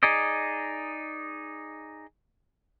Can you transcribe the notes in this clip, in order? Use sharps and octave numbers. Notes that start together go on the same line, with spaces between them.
D#4 G#4 D5 D#5